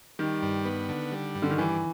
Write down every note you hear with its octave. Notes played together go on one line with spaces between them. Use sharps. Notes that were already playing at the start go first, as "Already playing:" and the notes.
D#3 G3
G2
B3
D3
G3
G2
D3
D#3
E3 G3